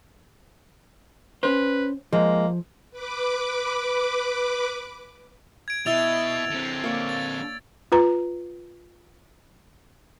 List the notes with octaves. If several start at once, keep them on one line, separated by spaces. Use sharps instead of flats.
C#4 B4 C5
F3 G#3 A#3
B4 D6
G#6 D7
B2 E4 D#5 E5 E6 A6 F7
D3 C4
A#3 C#5 D5
A6
F4 B4 A#5